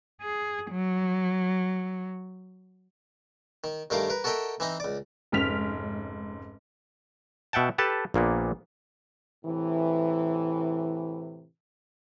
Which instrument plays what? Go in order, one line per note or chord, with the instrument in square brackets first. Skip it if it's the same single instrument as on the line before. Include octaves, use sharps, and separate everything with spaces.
[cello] G#4
F#3
[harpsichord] D#3
G2 D#3 A3 A#4 F5 D6
A#4 B4
F#4 A4 A#4 D#5 E5 G5
E3 C4 D#4 D#5
C#2 D5
[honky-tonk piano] F1 G#2 C#4 F6 B6 F7
[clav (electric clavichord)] B2 E5 F#5 G5 A5
G4 A4 B4 A5
A#1 A#2 A#3 B3
[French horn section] A2 C3 E3